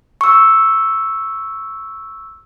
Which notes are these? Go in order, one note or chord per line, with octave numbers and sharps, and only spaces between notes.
C#6 E6